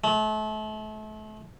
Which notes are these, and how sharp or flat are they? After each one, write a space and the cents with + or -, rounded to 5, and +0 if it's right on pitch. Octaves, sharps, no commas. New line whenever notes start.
A3 -35